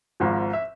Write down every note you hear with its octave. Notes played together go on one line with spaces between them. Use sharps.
G#1 G#2 F3
E5